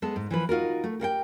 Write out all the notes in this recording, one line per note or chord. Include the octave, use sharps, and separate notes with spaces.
G#3 B3 A4
G#2
E3 F3 B4
D#4 F4 F#4 A#4
A3
G4 A#4 F#5 G5